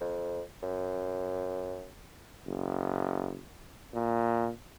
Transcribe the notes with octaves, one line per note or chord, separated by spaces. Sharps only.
F2
F#2
F#1
A#2